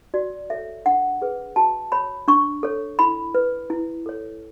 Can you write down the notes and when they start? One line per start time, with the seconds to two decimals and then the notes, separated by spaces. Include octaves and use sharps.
0.14 F#4 D5
0.50 A4 C#5 E5
0.86 D4 F#5
1.22 G#4 B4
1.56 F#4 A5
1.92 C#5 B5
2.28 D4 C#6
2.63 A4 C#5
2.99 E4 B5
3.35 B4
3.70 E4
4.06 A4 C#5